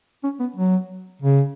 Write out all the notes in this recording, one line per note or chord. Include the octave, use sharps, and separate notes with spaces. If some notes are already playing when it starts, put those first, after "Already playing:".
C#4
B3
F#3
C#3